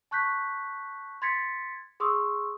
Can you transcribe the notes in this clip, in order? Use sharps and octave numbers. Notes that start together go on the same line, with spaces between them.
A5 C#6 F#6 G6 B6
C6 G#6 A6 B6 C#7
G#4 C6 C#6 D#6 E6